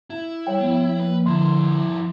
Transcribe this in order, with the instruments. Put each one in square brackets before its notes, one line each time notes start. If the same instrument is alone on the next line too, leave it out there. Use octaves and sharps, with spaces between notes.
[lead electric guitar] E4
[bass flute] G3 [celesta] C#5 G5
[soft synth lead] F3 [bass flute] B3
[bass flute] A#3 [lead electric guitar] B4
[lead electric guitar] F2 E4 [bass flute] D3 [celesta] C6